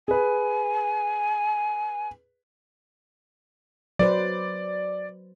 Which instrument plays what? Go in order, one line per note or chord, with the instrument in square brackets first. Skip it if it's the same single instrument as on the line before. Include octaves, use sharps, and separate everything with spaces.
[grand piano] G#4 B4 [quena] G#5
[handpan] F#3 B4 C5 [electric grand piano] D5